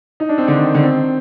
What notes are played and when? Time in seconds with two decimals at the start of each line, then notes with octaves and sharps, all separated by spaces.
0.20 D#4
0.29 D4
0.38 C4
0.48 D3
0.55 D#3
0.74 D3
0.83 C4